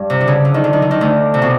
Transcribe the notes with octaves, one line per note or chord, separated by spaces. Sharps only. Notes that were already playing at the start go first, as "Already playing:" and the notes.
Already playing: G2
C3
D3
C#3
D3
D#3
D3
D#3
D3
D#3
D2 D3
C3
B2